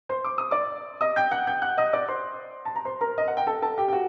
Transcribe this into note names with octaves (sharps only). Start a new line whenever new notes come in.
C5 C6
D6
D#6
D5 D6
D#5 D#6
G5 G6
F#5 F#6
G5 G6
F#5 F#6
D#5 D#6
D5 D6
C5 C6
A5
A#5
C5 C6
A#4 A#5
D#5
F#5
G5
A4 A5
A4 A5
G4 G5
G5
F#4